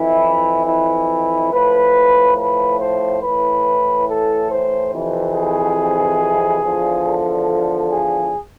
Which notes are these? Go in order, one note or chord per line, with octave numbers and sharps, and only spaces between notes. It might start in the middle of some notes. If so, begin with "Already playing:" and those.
Already playing: F2 E3 E4
E4
A2 F3 B4
B4
C5
A2 E3 B4
A4
C5
F2 C3 E3
G#4
E2 D3 F3
A4
G#4